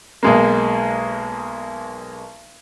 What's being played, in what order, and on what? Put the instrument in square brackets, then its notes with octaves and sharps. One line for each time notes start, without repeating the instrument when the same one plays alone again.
[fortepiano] B1 G#3 A#3